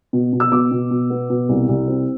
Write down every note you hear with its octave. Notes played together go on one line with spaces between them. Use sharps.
B2
B2
E6
B2 D6
B2
B2
B3
B2
C2
C2
C4